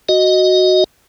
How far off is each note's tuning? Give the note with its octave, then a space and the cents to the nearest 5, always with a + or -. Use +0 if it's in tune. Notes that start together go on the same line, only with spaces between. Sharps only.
F#4 +0 D#5 +0